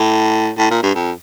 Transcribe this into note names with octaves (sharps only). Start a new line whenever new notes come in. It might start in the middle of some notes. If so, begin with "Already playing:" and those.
Already playing: A2
A2
A#2
G2
F2